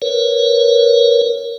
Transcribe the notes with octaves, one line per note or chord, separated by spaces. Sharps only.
A#4 B4 C#5